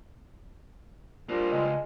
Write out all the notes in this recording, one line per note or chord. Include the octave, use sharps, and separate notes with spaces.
F3 G3 A#3 D4 F4
C#2 G#3